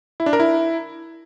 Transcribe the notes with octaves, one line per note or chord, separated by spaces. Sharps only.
E4
D4
A#4
E4